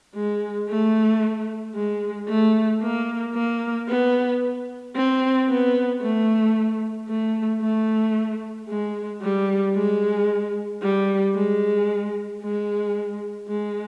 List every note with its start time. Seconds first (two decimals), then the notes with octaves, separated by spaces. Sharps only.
0.15 G#3
0.69 A3
1.75 G#3
2.28 A3
2.82 A#3
3.35 A#3
3.88 B3
4.95 C4
5.48 B3
6.02 A3
7.09 A3
7.62 A3
8.68 G#3
9.21 G3
9.75 G#3
10.82 G3
11.35 G#3
12.42 G#3
13.48 G#3